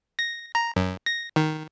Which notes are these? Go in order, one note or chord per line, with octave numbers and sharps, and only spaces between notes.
A#6
A#5
F#2
A#6
D#3